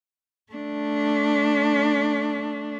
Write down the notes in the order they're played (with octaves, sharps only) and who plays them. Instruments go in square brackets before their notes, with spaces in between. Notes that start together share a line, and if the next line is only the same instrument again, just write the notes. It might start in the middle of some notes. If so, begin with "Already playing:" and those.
[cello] A3 D4